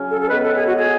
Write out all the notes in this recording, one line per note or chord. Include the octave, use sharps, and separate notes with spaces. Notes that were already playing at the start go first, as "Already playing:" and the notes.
Already playing: C#3 F#3 C#4
A4
A4
A2 G#3 B3 B4
A4
G#4
F#4
G#4